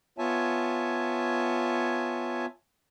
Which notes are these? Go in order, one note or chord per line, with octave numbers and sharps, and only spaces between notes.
B3 F4 C#5 E5 G#5 A5